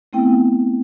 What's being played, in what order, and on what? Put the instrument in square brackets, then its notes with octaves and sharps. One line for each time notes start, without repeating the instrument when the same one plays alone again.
[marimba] A3 B3 C4 E4 G5